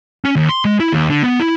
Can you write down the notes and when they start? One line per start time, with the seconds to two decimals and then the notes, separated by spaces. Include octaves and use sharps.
0.25 C#4
0.36 D#2
0.49 C6
0.65 G#3
0.80 E4
0.93 D#2
1.10 D3
1.23 B3
1.40 E4